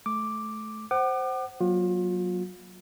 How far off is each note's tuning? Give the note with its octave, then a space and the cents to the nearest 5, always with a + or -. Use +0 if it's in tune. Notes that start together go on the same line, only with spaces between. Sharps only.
A3 -20 D6 +0
C5 +0 F#5 +30 D6 +35
F#3 +0 A#3 +30 F4 +35